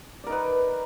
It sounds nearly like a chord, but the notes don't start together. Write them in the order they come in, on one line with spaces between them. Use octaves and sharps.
D5 A#4 D#4 B4